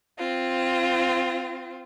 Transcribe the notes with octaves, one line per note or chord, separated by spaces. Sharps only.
C4 F4